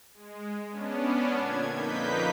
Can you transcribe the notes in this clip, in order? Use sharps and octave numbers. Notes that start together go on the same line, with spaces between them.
G#3
B3 C#4 D4
A#2 D3 G#6
F2 A#3 D#4 B4 G6 B6